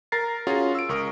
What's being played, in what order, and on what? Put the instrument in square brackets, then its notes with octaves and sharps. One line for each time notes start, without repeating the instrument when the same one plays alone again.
[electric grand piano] A#4 A#5 A6 C7
C#4 F4 F#4 G#4
E6 D7
C#2 A#4 C#6 D#6